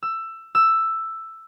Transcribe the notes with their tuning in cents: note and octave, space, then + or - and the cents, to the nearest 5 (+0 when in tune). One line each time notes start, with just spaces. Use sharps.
E6 +15
E6 +5